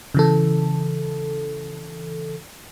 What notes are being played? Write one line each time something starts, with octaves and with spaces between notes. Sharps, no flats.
C#3 E3 A4